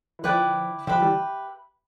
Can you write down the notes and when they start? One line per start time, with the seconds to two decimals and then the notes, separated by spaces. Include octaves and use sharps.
0.19 E3
0.24 D3 F3 E4 B4 D5 G5
0.87 D3 F3 G4 B4 E5 B5
1.02 E3 G3